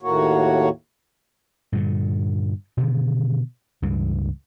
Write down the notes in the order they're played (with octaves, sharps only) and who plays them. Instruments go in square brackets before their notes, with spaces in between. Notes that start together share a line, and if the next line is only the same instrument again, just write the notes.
[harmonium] D#2 A2 A#3 F#4 C#5
[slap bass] G2 A#2 D3
B2 D3 D#3
C#2 G2 E3